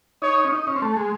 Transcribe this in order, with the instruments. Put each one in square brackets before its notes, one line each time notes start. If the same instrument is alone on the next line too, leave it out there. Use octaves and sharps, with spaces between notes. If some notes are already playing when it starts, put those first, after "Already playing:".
[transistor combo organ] D#4 [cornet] C#5
[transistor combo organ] C#4
D#4
C#4
C4
A3
G#3